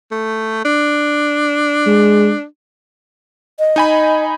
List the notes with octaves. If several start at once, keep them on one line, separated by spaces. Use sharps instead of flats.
A3
D4
G#3
D#5
D#4 G#5 B5